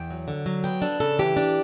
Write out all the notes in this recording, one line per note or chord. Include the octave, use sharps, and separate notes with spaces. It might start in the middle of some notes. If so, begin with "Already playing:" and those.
Already playing: E2 G5
F#3
D3
F#3
B3 G5
D4 A4
C#3 A4
E3 G4
D4